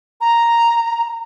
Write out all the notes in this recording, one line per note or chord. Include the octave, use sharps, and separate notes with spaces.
A#5